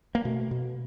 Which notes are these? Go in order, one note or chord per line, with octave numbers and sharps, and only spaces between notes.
A#3
B2 A3
B2